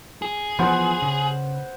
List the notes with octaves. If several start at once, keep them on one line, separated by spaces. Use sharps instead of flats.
G#4
E3 F3 B3 B4 C5 F#5
C#3